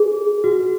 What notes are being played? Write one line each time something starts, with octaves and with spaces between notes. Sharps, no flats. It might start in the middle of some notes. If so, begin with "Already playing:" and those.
Already playing: G#4
F#4